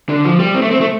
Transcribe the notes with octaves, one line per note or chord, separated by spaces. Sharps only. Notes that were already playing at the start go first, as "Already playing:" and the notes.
D3
F3
G3
C4
A3
C4
A3